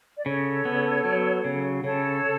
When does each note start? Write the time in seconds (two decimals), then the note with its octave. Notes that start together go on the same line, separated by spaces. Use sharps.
0.16 D5
0.25 C#3 A4 C#5
0.65 B3
1.05 F#3
1.44 C#3
1.84 C#3 A4 C#5